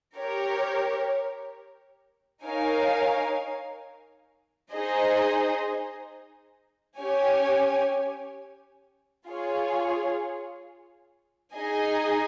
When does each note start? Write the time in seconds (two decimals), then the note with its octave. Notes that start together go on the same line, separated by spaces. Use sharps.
0.18 G4 A#4 C#5
2.45 D#4 A#4 C#5 F5 G#5
4.72 D#4 G#4 C5 D#5
6.99 C#4 G4 C#5 G#5
9.27 F4 G#4 C#5
11.54 D#4 G#4 D#5 G#5